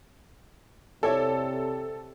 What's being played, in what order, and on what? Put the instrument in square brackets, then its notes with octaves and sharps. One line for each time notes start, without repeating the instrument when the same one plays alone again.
[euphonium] C3 [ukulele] E4 C#5 D5 [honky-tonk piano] A4